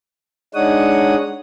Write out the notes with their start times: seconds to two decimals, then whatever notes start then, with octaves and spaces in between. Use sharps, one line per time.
0.55 G#3 D4 D#4 C#5 F#5 D#6